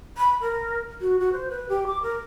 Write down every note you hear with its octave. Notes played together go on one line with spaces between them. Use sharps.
B5
A#4
F#4
F#4
C5
B4
G4
D6
A#4